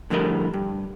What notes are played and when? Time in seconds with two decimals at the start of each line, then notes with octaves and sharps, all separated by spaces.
0.10 A2 D3 F3 G3 A#4 D#5
0.54 G2